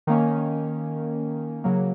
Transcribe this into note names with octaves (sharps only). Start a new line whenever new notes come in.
D#3 A#3 C#4
C#3 F#3 A#3